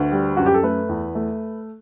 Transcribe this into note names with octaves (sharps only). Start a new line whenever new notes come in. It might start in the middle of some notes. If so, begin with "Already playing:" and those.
Already playing: D2 B4
G3
F#2 F#4
G4
A4
A3 B4
E2
A3